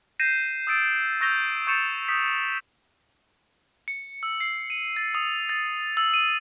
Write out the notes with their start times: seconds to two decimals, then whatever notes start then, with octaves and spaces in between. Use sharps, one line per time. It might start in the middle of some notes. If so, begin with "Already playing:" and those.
0.20 G6 A#6 C7 D#7 E7
0.67 D#6 E6 A6 D7
1.21 C#6 E6 G6 A#6 F7 G7
1.67 C#6 G6 A6 C#7 E7 F7
2.09 D#6 G6 B6
3.88 C#7
4.23 E6
4.40 C7
4.70 D#7
4.97 A6
5.15 D#6
5.49 A6
5.97 E6
6.14 D#7